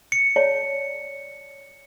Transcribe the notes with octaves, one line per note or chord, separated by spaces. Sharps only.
C#7
C#5 D5 A5